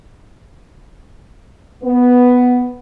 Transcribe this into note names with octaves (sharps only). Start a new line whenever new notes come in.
B3